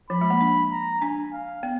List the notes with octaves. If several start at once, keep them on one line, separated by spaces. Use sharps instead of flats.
F3 B5
G#3
A#3
D4
A#5
D4 G#5
F5
B3